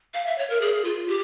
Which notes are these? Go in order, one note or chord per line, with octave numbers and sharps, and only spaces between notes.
F5
E5
C#5
A#4
G#4
F4
G4